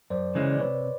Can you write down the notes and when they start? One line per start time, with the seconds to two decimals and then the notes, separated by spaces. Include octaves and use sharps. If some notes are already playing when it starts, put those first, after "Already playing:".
0.10 F#2 C5 D5
0.35 C#3 E3 G#3 C#4
0.52 D5
0.60 C3 B4 C#5